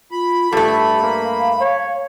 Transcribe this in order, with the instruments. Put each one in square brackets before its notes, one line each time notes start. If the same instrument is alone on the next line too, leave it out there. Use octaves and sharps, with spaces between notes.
[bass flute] F4 [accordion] B5
[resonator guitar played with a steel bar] G2 A3 [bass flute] G4 [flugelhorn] A4
[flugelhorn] A#3 [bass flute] F5
[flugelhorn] C#5